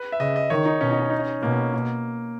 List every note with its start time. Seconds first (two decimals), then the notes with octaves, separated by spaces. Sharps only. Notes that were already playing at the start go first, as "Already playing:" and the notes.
Already playing: B4
0.12 E5
0.20 C#3 D#5
0.36 D#5
0.50 D#3 C#5
0.65 D#4
0.81 B2 C#4
0.91 D#4
1.00 C#4
1.10 D#4
1.19 C#4
1.42 B2 A#3
1.74 A#3